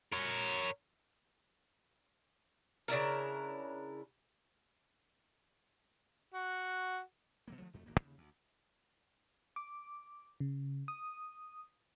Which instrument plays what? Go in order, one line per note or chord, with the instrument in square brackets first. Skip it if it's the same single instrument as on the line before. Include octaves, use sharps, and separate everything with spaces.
[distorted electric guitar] A#4 C#5
[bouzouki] C#3 D4 E4 A#4
[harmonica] F#4
[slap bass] B2 F#3 A#3
D#3 F3 F#3 A3
E1 F2 A3
D1 G#1 A#3
D#2 C#3
D2
[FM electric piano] D6
C#3
D#6